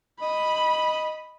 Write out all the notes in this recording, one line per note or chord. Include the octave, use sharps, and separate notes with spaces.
D#5 B5